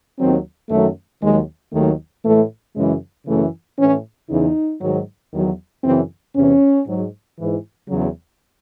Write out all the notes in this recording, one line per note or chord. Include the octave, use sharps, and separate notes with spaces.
D#2 D#3 F#3 C4
F#2 D#3 F#3 A3
D#2 D#3 F#3 G#3
D#2 D#3 F#3 A3
A2 E3 A3
F#2 C#3 E3 G#3
F#2 C#3 E3 A3
A2 E3 C#4
E2 C#3 E3 D#4
G#2 D#3 F#3
E2 D#3 F#3
F#2 C#3 E3 C4
E2 C3 E3 C#4
G#2 F#3
G#2 E3
E2 C#3 F#3